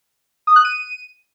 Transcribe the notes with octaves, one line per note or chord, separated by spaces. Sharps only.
D#6
F#6
D#7